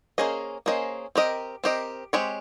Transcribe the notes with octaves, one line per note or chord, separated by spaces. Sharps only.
A#3 C#4 G#4 C5 D#5
A#3 C#4 G#4 C5 D#5
C4 G4 A#4 D#5
C4 G4 A#4 D#5
G#3 C4 G4 C#5